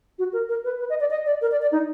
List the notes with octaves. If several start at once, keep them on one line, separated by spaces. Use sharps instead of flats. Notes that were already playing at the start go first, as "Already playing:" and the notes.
F#4
A#4
A#4
B4
B4
D#5
D5
D#5
D5
A#4
D5
D5
D#4